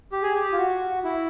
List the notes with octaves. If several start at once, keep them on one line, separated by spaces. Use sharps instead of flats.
G4
G#4
G4
F4
F#4
E4